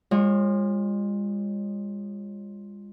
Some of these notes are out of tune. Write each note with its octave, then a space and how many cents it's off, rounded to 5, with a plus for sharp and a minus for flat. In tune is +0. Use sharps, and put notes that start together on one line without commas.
G#3 -40 F4 +0 C#5 -35